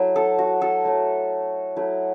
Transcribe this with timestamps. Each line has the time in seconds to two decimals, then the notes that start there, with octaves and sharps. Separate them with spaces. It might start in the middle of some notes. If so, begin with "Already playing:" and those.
Already playing: F#3 A3 E4
0.16 A4
0.38 F#4
0.62 A4
0.84 F#3 A3 E4
1.76 F#3 A3 E4